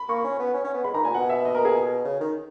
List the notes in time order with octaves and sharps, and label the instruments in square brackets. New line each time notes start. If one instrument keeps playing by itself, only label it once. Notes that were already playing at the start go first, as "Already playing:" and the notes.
Already playing: [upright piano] B5
[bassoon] A#3 [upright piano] C#6
[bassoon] C#4
B3
C#4
C#4
B3
[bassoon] G#3 [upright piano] B5
[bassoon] D#3 [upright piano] A#5
[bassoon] A#2 [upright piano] G#5
[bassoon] B2 [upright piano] F#5
[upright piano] E5
D#5
A#4
G#4
[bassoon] C#3
D#3